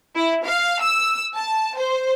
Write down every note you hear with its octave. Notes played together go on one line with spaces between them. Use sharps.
E4
F5
E6
A5
C5